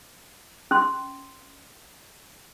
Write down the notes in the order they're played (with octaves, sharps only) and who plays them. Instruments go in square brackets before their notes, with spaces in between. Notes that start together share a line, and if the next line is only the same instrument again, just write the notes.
[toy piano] C#4 C6